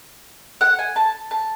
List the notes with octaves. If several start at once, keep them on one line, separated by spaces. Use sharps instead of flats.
F#5
G#5
A5
A5